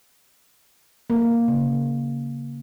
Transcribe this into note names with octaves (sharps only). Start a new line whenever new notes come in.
A#3
C#3